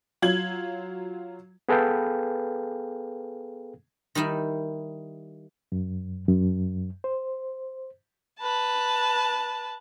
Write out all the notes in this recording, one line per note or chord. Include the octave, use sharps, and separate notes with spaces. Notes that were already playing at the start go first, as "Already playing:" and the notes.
F#3 F4 G#6 F#7
B3 G#4 A4 B4 F5 G5
D#3 G3 D#4 E4
F#2
F#2
C5
B4 A5